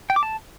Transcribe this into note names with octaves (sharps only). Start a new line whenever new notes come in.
G5
D6
A5